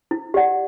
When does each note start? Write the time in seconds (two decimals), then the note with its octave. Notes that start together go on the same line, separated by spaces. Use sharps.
0.11 E4
0.34 G4 D5 F#5